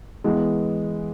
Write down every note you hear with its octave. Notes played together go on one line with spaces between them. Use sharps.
E3 G#3 B3